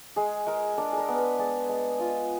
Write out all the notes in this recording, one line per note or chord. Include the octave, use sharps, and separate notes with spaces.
G#3 G#4
G#3 A#4
D4 A#4
G#4
A#4
B3
B4
G#3 D5
G#3
F4 D#5